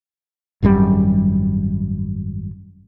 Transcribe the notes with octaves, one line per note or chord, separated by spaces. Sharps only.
G#1 F#2 D3 G3